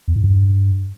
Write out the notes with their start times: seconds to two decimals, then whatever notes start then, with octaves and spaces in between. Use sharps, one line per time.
0.08 E2
0.16 G#2
0.24 G2